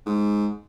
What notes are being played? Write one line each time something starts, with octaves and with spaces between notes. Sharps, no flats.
G#2